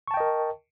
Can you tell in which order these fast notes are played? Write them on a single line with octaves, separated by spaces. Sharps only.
C#6 A5 G5 D#5 A#4